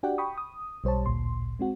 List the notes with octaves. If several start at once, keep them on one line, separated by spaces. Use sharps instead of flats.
D4 F#4 G4 D5 F#5 G5
G5 B5 C#6 D#6
D#6
B1 G3 C5 C#5 A5
A1 D2 A#2 C6
G#3 C4 F#4